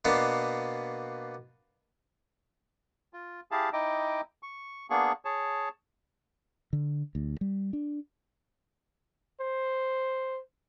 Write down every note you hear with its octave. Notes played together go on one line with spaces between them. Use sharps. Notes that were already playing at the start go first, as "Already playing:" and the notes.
B2 A#3 B3 D4
F4
E4 G4 G#4 F5 A5
D#4 E4 D#5 G5 D6
C#6
A#3 B3 D4 G#4 C#6
G#4 C#5 A5
D3
D2
G3
D4
C5